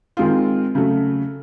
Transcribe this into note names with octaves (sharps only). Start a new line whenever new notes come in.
D#3 G#3 C4 F4
C#3 F#3 A3